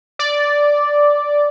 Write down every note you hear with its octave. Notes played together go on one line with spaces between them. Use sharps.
D5